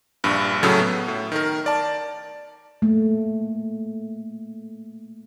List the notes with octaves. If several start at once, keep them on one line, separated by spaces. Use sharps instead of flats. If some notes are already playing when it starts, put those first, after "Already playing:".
A#1 G2
A2 C#3 F#3 A3
B3
A2
D#3 A#4
D5 A5
A3 A#3